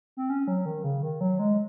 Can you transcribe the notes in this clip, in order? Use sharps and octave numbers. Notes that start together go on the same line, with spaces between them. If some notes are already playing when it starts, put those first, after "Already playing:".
C4
C#4
F#3
D#3
C#3
D#3
F#3
G#3